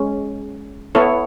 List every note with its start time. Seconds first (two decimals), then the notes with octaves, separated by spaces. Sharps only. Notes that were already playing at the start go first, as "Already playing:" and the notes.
Already playing: G#3 C#4
0.95 B3 E4 A4 C#5